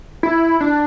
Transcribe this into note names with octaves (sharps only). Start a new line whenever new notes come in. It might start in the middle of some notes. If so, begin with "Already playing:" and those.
E4
D4